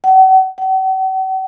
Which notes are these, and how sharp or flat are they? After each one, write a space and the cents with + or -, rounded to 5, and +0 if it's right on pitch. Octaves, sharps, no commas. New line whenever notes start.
F#5 +40
F#5 +45